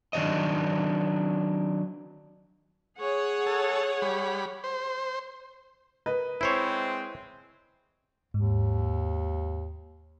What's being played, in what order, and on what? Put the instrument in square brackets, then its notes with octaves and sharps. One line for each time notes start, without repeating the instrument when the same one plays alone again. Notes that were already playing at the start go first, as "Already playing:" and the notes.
[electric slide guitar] D#3 F#3 D4 C#5 D#5
[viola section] G#4 C#5 F#5
[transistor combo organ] A4
G3 B5
C5
[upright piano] A#4 B4 D#5
[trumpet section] G#3 C4 [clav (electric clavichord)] E4 C5 C#5
[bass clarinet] D#2 [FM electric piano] G#2